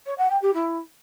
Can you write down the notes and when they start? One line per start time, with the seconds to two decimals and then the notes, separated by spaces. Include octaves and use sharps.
0.06 C#5
0.18 F#5
0.30 G5
0.42 G4
0.54 E4